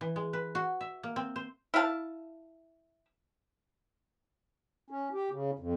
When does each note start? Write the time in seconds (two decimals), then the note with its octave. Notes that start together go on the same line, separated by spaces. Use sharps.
0.01 E3
0.16 G#3
0.33 B4
0.55 F#4
0.81 E5
1.03 A#3
1.16 C4
1.36 C5
1.74 E4 F5 F#5 A5
4.90 C#4
5.13 G4
5.31 C#3
5.59 F2